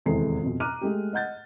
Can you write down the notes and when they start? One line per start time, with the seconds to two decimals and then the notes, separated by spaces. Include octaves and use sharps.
0.06 D#1 E2 C3 G#3 A4 C7
0.42 F2 B2
0.60 A#5 D6 F6 F#6 D#7
0.81 G#3 A3 G4
1.13 D#5 F#5 G6 A6